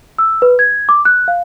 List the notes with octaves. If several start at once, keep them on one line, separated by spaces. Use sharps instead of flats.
E6
B4
G#6
D6
F#6
F5